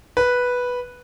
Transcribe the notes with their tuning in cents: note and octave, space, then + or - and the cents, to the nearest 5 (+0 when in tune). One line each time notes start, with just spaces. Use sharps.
B4 -5